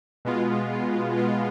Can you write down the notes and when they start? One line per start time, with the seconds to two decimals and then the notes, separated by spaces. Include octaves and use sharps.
0.25 B2 G#3 B3 F4
1.17 B2 G#3 B3 F4